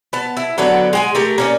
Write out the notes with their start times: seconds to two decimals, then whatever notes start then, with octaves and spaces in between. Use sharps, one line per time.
0.13 B3 A5
0.37 E4
0.58 D3 F#3 B3 D4
0.93 G#3 G5 G#5
1.15 A3 G4 A#4
1.38 A#3 C#4 D5